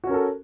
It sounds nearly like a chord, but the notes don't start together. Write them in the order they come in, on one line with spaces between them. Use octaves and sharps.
F#4 C#4 A#4 A4